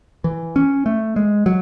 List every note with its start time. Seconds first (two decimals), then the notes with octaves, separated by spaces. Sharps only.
0.24 E3
0.56 C#4
0.86 A3
1.16 G#3
1.46 F#3